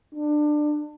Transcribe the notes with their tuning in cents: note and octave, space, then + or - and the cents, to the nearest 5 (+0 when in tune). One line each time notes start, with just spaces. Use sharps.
D4 +25